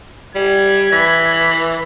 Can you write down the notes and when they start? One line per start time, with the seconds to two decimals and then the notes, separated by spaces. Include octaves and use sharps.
0.35 G3 G#6
0.92 E3 B5